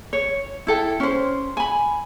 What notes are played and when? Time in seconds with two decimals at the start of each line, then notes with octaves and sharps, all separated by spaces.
0.13 C#5
0.67 E4 A4 G5
1.00 C#4 C5
1.57 G#5 B5